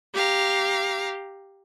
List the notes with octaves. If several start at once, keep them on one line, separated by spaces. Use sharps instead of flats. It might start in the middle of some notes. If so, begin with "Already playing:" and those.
G4 F5 A#5